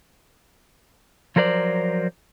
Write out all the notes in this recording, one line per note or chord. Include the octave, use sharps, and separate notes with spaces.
F3 F#3 A#4 C5 D5